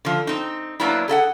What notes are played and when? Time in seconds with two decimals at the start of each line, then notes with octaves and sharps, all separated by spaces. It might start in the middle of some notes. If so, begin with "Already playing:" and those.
0.05 D3 F3
0.27 C4 D#4
0.80 F#3 A#3 B3 D4 E4
1.08 G#4 A4 E5 F#5